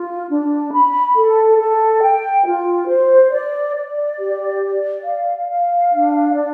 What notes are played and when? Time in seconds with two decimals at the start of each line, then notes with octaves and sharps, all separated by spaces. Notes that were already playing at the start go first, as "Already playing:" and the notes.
Already playing: F4
0.29 D4
0.72 B5
1.15 A4
1.59 A4
2.02 G5
2.46 F4
2.88 C5
3.32 D5
3.76 D5
4.19 G4
4.62 D5
5.05 F5
5.49 F5
5.92 D4
6.34 D5